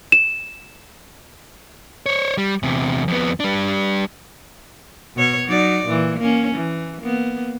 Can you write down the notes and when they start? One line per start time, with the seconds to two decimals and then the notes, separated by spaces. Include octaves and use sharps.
0.12 E7
2.06 C5 C#5
2.38 G3
2.63 E2 C3
3.08 F2 B3
3.40 G3 D4
5.16 B2 C#5
5.48 F#3 D#4 D5
5.86 A#2 E3
6.18 A#3 C#4
6.55 E3
7.01 A#3 B3